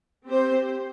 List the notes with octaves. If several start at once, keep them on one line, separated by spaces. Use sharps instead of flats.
C4 G4 C5